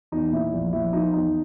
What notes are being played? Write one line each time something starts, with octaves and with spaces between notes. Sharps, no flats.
E2 D#4
A#2 E4
A#1
A#1 E4
F3 D#4
E2 D#4